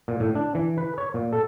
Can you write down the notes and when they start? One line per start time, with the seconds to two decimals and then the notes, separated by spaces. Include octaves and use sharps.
0.08 A#2
0.20 A2
0.35 D4
0.55 E3
0.78 B4
0.98 C#5
1.14 A#2
1.33 A4